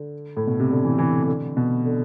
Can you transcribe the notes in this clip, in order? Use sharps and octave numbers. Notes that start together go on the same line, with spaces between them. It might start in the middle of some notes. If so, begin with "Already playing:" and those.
Already playing: D3
A2
B2
C3
D3
E3
E3
E3
D3
B2
D3